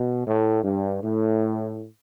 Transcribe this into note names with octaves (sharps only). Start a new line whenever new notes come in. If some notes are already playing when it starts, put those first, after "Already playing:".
Already playing: B2
A2
G2
A2